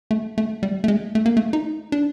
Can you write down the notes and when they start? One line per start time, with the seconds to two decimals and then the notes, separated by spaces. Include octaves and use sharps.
0.11 A3
0.38 A3
0.63 G3
0.84 A3
0.88 G#3
1.15 A3
1.26 A#3
1.37 A3
1.53 D#4
1.92 D4